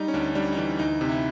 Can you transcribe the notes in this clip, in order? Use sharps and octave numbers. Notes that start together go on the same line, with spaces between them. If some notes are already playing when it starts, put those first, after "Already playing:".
Already playing: G3 D#4
C#4
D2 D4
G3 D4
D#4
E3 D4
D2 D#4
C3
E4